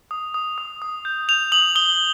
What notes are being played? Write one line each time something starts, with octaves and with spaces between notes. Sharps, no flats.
D#6
D#6
D#6
D#6
G6
G6 F7
D#6 F#7
D#6 G7